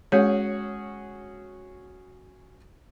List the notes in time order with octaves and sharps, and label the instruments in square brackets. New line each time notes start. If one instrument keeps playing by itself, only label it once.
[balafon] G#3 C#5 [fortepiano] C#4 F#4 G#4